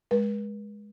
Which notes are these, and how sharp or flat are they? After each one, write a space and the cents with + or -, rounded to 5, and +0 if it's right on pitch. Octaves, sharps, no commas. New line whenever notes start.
G#3 +0 B4 -45